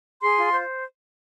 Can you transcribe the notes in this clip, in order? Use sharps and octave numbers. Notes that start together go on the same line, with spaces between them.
G#4 C6
F4
C5